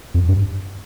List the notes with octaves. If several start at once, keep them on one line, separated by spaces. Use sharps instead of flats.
F2
G2